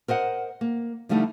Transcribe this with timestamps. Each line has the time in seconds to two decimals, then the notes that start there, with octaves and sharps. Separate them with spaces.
0.08 A#4 C5 D#5 F#5
0.61 A#3
1.09 D3 F3 G3 A3 D#4 E4